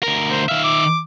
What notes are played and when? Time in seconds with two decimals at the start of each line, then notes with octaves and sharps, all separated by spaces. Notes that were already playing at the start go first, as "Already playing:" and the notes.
0.03 D2 A#4
0.31 C5
0.49 D#3 E5 F5
0.64 D6